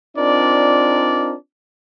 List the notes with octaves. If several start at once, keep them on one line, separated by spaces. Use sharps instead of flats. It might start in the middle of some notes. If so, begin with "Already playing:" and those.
C4 D4 D#4 F4 A#4 D5